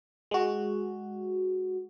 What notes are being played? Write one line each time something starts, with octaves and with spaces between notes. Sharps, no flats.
G#3 F#4